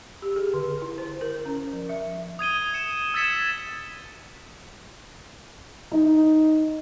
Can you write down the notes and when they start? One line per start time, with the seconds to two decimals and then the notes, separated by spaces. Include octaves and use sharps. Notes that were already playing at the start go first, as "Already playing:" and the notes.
0.22 G4
0.36 G#4
0.54 D3
0.82 E4
0.98 C5
1.21 A#4
1.34 A#4
1.46 C#4
1.73 F3
1.89 E5
2.39 D#6 G#6 D#7 G7
2.74 C#7 E7
3.14 E6 G#6 A6 B6 C#7 E7
5.92 D#4